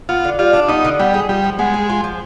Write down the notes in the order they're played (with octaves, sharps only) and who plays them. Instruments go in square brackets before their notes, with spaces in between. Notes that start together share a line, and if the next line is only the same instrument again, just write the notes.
[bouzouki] B3 [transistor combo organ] F4
[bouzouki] D3
[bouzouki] G3 [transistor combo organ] F4
[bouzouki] D4
[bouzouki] B3 [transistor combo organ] D#4
[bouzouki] D3
[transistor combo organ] G3 [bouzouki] B3
[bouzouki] G#4
[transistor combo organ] G3 [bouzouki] F4
[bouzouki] F3
[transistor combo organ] G#3 [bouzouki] B3
[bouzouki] G#4
F4
F3